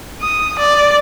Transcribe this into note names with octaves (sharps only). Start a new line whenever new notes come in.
D#6
D5